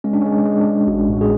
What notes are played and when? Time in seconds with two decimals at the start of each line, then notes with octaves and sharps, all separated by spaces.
0.04 G#3 C#4
0.13 D4
0.21 C#4
0.26 G#3
0.32 D4
0.45 G#3
0.60 D4
0.66 G#3
0.87 A1 F#4
1.09 A2 F#4
1.21 G#4